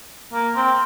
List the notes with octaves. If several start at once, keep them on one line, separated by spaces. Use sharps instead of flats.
A#3
C4